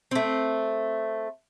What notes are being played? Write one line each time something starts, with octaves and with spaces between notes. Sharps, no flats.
A3 C4